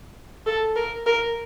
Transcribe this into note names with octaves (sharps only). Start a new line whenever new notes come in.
A4
A#4
A#4